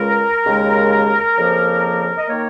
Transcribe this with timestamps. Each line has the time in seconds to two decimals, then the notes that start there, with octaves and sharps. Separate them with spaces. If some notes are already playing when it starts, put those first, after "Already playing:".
Already playing: C#2 C#3 G#3 A#4
0.45 D#2 C#3 G#3
1.37 F2 C#3 F3 A#3
2.18 D#5
2.29 D#3 A#3 C#5